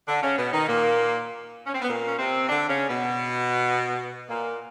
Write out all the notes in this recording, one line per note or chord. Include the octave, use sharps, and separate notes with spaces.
D3 D4
C#3 C#4
B2 B3
D#3 D#4
A#2 A#3
C#4
C4
B3
A#2 A#3
C#4
C3 C4
D3 D4
C#3 C#4
B2 B3
A#2 A#3